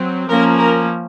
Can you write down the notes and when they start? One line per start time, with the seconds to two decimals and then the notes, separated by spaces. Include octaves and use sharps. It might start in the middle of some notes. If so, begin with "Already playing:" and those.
Already playing: F#3 C4
0.28 F3 A#3 C#4 A#4
0.57 A#4